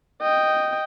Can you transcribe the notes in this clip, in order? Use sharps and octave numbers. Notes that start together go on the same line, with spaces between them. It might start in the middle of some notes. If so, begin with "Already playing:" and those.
D#5 G5